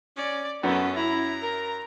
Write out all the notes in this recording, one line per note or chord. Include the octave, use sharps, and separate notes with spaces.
C#4 D5
F#2 B3 C#4 A4
E4 A#5
A#4